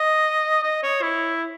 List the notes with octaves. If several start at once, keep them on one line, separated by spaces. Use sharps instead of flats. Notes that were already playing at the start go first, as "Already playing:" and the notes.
Already playing: D#5
D#5
C#5
E4